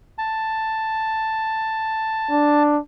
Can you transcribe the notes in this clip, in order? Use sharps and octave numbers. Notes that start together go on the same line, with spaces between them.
A5
D4